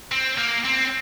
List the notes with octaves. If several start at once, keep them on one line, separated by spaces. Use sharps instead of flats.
C4
A#3
C4